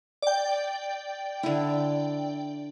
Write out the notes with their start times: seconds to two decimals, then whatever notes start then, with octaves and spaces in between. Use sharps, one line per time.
0.22 D5 G5
1.43 D3 E4